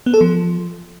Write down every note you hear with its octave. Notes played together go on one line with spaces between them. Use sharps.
B3
A4
F3